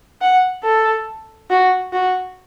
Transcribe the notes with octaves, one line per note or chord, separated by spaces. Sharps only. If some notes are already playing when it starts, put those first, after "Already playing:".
F#5
A4
F#4
F#4